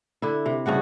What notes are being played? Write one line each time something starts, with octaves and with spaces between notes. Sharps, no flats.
D3 E4
C3
G2 C#3 F#4 F#5